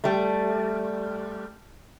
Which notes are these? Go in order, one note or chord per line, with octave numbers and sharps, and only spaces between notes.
G3 A3